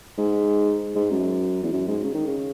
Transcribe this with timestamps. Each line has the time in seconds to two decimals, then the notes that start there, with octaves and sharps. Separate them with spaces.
0.18 G#2
0.95 G#2
1.11 F#2
1.63 E2
1.72 F#2
1.87 G#2
2.04 C#3
2.14 D#3
2.27 C#3